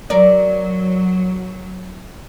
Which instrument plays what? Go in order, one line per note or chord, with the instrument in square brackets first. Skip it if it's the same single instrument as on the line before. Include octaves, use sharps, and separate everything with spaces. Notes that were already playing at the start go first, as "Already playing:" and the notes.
[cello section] F#3 [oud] A#4 D5